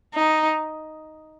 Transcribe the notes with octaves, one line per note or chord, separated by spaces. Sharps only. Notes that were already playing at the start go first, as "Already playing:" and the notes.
D#4